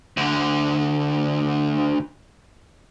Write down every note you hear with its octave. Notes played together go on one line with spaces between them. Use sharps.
D2 D3